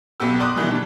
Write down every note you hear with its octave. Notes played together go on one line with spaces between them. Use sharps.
B1 B2 B3 G4 E6
D5 C6 D6 D#6 F#6
B2 D#3 E3 G3
G3 D4